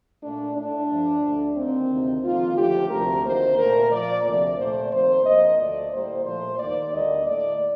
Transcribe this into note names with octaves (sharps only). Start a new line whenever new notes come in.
A#2 A3 D4
A2 A3 D4
G2 F3 A3
D2 D3 A3
D#2 D#3 A#3 C4
D2 C3 D#3
F2 D#3 A#3 F4
D#2 D3 F3 A3 G4
D2 C3 F3 A3 A#4
D2 C3 D#3 A#3 C5
A#2 A3 A#4
A#2 F3 A#3 D5
D2 C3 F3 A3 D5
A#2 A3 C5
F2 D#3 A#3 C5
G2 F3 A#3 D#5
D2 D3 A3 D5
A2 G3 A#3 C5
A#2 F3 A3 C5
D#2 D#3 A#3 D5
D2 D3 G3 A#3 D#5
A2 A3 D5